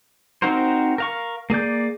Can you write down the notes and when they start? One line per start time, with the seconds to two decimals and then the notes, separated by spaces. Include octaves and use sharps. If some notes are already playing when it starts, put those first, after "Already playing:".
0.42 C4 D#4 F#4 A#4 C5
0.98 A#4 F5 C#6
1.50 A#3 G#4 D5 G6